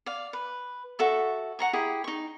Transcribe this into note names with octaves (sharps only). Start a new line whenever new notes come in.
D5 F5
B4
F#4 A4 E5 C#6
F#5 A#5 C#6
E4 G4 G#4
D#4 C#6